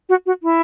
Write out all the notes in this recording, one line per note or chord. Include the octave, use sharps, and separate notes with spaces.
F#4
F#4
E4